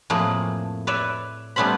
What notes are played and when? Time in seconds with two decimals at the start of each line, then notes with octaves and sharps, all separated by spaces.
0.10 F2 A2 A3 A#3 G#4 B5
0.87 B4 C#5 D5 E5
1.56 G3 A3 B3 C#4 C5 B5